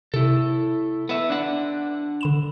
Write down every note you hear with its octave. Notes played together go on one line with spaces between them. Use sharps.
C3 E4 A4
B3 E5
D4 F#5
D3 B5 E7